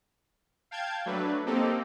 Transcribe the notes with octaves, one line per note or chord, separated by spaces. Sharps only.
F5 G5 A5 G6 G#6
F#3 A3 D4 B4
A#3 C4 D#4 G4 A4